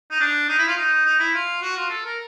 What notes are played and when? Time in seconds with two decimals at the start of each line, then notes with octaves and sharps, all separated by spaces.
0.11 D#4
0.20 D4
0.48 D#4
0.58 E4
0.67 F4
0.77 D#4
1.05 D#4
1.19 E4
1.34 F4
1.62 F#4
1.76 F4
1.90 A4
2.05 A#4